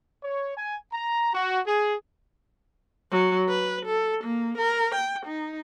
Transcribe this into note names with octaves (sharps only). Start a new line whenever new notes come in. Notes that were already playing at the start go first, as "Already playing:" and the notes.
C#5
G#5
A#5
F#4
G#4
F#3
B4
A4
A#3
A#4
G5
D#4